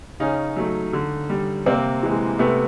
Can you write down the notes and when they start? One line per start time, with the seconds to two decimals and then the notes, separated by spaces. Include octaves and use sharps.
0.20 C#3 C#4 D#4
0.56 F#3 A3
0.93 D3
1.30 G3
1.66 C3 A#3 C4
2.03 E3 G#3
2.39 C3 A3 B3